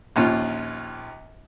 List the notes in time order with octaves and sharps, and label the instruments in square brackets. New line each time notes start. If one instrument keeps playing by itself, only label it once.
[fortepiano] A#1 D#2 C#4 F4